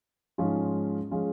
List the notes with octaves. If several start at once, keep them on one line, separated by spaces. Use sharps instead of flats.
G#2 F3 G#3 C#4 F4
F3 G#3 C#4 F4